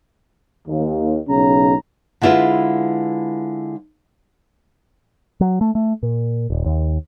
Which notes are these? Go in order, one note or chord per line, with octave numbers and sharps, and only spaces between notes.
D#2
B1 C#3 C#4 A#5
D3 G#3 E4 F4 B4
F#3
A3
A3
A#2
D#1
D#2